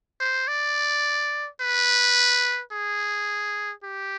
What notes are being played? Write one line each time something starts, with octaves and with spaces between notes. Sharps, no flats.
C5
D5
B4
G#4
G4